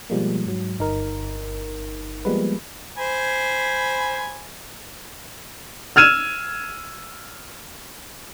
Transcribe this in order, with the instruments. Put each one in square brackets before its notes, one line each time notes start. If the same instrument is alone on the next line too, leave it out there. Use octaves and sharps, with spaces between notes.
[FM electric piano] B2 F3 G3 G#3 A#3
G#2 F#3
G1 D#4 A#4
F3 G3 G#3 A#3 B3 B4
[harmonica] C5 G#5 B5
[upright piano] E6 F6 G#6 D#7 E7